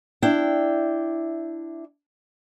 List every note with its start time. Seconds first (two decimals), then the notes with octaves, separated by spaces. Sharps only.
0.22 D4 E4 G5